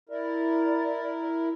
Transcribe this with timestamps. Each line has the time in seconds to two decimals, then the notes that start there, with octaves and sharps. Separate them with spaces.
0.09 E4 A#4 D5